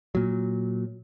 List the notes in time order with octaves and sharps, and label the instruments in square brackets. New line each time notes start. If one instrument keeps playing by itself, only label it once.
[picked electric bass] A#2 F#3